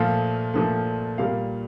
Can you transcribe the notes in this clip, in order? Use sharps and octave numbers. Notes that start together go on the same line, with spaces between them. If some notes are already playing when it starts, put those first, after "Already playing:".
Already playing: A#2 F3 A3 F5
A#2 F3 A3
A#2 G3 A#3 F5